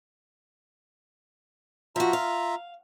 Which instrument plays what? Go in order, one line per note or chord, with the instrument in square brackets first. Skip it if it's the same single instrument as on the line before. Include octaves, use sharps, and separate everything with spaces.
[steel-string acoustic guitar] F3 F#4 [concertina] F4 E5 A#5
[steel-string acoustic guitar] F5